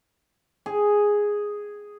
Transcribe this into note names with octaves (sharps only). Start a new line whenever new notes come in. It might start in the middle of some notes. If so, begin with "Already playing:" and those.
G#4